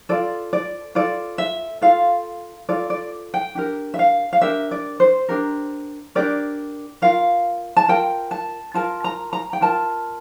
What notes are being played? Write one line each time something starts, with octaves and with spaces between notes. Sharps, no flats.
F4 A4 D5
D5
F4 A4 D5
E5
F4 A4 F5
F4 A4 D5
D5
G5
D4 G4 A#4
E5
F5
F5
D4 G4 A#4 E5
D5
C5
D4 G4 A#4
D4 G4 A#4 D5
F4 A#4 F5
A5
F4 A#4 G5
A5
F4 A#4 A5
A#5
A#5
G5
F4 A#4 A5